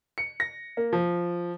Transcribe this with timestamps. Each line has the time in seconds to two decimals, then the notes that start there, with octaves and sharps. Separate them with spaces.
0.18 C#7
0.40 A#6
0.77 A#3
0.93 F3